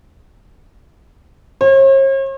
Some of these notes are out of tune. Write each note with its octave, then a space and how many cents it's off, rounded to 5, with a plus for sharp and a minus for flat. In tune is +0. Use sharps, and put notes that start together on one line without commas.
C#5 -45